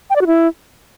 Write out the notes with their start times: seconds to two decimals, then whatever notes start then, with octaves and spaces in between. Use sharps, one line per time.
0.10 G5
0.16 D5
0.21 F#4
0.27 E4